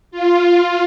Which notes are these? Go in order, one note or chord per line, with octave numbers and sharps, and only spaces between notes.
F4